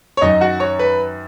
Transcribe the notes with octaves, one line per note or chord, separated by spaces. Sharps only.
C#5
F#2 D#3 F#3 D#4 D#5
F#4 F#5
C#5 C#6
B4 B5